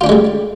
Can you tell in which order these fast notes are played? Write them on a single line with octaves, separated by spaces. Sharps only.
F4 D4 C#4 G#3 G3